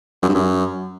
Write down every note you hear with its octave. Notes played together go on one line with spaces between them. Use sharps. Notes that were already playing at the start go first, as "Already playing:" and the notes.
F#2
G2
F#2